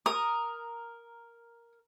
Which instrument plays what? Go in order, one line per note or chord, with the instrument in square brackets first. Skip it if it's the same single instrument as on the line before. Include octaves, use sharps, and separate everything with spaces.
[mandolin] A#4 [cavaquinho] D#6